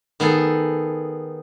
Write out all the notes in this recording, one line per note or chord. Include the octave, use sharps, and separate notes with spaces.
D#3 B3 G#4 A4